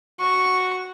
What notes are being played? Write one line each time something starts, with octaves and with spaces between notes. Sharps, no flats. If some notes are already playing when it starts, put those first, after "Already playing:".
F#4 C#6